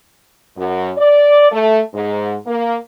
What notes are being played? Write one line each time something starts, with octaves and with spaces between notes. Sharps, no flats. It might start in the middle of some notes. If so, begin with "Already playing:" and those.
F#2
D5
A3
G#2
A#3